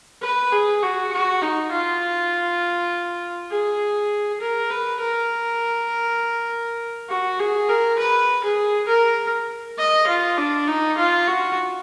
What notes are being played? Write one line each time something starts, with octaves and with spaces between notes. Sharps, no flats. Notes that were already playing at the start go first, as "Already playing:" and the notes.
B4
G#4
F#4
F#4
D#4
F4
G#4
A#4
B4
A#4
F#4
G#4
A#4
B4
G#4
A#4
D#5
F4
D4
D#4
F4
F#4